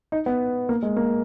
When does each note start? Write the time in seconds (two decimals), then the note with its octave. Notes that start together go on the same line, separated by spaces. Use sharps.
0.12 D#4
0.26 B3
0.69 A#3
0.83 G#3
0.97 A#3